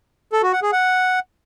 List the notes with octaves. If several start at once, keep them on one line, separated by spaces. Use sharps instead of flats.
A4
F#4
F#5
G#4
F#5